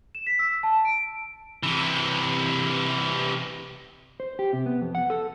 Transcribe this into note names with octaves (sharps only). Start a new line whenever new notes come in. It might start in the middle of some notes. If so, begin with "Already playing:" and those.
E7
B6
E6
A5
D7
C3 E3
C5
G4
C3
B3
F2
F#5
A4